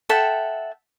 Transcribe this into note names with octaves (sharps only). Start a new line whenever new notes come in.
A4 E5 F#5 G5